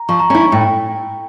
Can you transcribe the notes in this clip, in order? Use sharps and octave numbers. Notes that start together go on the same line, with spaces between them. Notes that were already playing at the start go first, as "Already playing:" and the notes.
Already playing: A#5
F3 C#6
A#5
C#4 E4 A#5
C#6
A2 G5